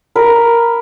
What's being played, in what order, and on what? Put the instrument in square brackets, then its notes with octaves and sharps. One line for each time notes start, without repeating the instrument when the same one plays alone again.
[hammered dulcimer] A#4 B5